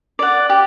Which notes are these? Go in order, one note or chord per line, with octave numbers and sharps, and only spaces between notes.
D5 F#5
G4